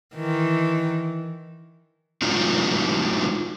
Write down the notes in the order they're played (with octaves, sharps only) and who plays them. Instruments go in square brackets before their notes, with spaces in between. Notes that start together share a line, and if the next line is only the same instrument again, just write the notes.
[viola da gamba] D#3 E3
[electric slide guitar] F#3 G#3 A3 D4 D#4 F4